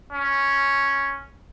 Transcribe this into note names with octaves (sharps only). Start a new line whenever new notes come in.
C#4